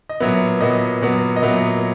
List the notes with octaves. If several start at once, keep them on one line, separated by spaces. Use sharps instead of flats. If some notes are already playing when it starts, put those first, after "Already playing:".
D#5
A#2 F#3 B3 E5
A#2 F#3 B3 D#5
A#2 F#3 B3
D#5
A#2 F#3 B3 E5